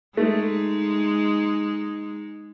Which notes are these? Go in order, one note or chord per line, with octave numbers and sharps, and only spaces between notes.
G#3 A3 D#4